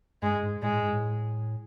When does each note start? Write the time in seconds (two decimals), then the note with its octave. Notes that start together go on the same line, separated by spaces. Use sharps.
0.22 G2 G#3
0.43 G#2
0.62 A2 G#3
0.72 A2
0.82 G#2
0.93 A2